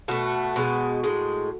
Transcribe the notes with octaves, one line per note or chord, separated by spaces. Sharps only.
B2 A3 F#4
B2 G#3
A2 G#3